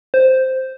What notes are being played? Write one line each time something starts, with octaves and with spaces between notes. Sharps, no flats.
C5